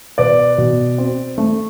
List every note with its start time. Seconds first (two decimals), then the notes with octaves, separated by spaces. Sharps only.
0.18 B2 B4 D5
0.58 B2
0.98 C4
1.38 A3